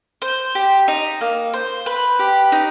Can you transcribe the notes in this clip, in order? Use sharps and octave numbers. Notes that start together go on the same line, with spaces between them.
C5
G4
D#4
A#3
C5
B4
G4
D#4